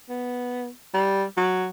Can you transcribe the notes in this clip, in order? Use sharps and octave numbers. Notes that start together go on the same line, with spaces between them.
B3
G3
F#3